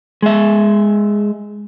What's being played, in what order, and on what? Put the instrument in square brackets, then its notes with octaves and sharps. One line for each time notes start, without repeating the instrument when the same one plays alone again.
[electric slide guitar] G#3 E5